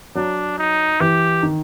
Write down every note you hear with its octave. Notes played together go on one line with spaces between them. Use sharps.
F#3 D4
D#4
E3 G4
D#3